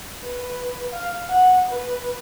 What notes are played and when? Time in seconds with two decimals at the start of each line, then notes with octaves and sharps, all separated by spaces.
0.24 B4
0.92 F5
1.29 F#5
1.69 B4